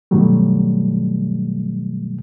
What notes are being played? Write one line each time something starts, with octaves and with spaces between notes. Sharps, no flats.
G2 B2 D#3 F#3 G3 A3